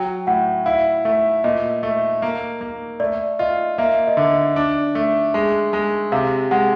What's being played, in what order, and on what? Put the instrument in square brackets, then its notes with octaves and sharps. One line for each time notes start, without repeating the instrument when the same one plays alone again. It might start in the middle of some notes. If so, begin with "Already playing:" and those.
Already playing: [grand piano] F#3 [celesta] G5
[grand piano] A2 [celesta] F#5
[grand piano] E4 [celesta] F5
[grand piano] A3 [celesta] E5
[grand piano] A#2 [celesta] D#5
[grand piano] A3
A#3
A#3
[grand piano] A3 [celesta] D5
[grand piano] F4 [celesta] D#5
[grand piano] A#3 [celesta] E5
[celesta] D#5
[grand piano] D3 [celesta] E5
[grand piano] D4
A3
G#3
G#3
[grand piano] C3 [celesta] F5
[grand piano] G#3 [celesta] F#5